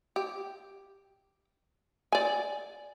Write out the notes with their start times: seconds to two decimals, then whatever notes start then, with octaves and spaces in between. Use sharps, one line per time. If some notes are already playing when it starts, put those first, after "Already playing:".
0.16 G4
2.12 D5 G#5